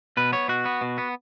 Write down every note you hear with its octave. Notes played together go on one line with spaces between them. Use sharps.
B2 B4
B3 C#5
B2 F#4
B3
B2
B3